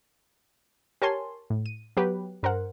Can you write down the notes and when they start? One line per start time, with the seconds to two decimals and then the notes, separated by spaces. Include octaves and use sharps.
1.02 G4 A#4 C#5 G#5 A5 C6
1.50 A2
1.66 D#7
1.97 F#3 B3 G4 B4
2.43 G2 A#4 C5 F#5